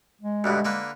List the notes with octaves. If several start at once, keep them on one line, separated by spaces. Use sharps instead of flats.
G#3
D2 G2 B2
D3 A#3 B4